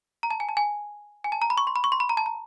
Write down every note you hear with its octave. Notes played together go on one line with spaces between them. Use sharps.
A#5
A5
G#5
A5
G#5
G#5
A5
A#5
B5
C#6
C6
B5
C#6
C6
B5
A#5
A5
A#5